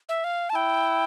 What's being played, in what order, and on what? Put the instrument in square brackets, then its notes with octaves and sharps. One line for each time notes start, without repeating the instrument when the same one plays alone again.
[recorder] E5
F5
A5
[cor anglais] E4 [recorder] G5